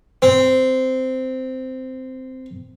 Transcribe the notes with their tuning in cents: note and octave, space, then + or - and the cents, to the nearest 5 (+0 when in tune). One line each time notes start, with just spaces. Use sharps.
C4 -10